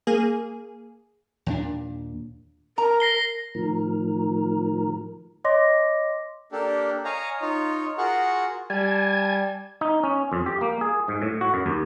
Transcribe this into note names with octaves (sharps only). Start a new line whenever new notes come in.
A#3 G#4
D#2 A#2 D4
A#4 A#5
A#6 C7 G7
A2 D#3 F3 A#4
C#5 D#5 C6 D6 A#6
A#3 D4 G4 A4
C#5 D#5 F5 G#5 A#5
D#4 F4 C#5
F4 F#4 G#4 A#4 F#5 C#6
G3 G#5 A5 G#6
D#4
C#4
F2
G4
A#3
G#4
G#2
A2
F#4
F#2
D#2